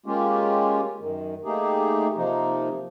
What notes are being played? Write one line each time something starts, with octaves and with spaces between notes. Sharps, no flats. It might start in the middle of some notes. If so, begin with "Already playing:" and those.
G#3 A#3 C#4 F4 G4
F#2 D#3
A3 A#3 D#4 G4 G#4
C3 F3 A#3 D#4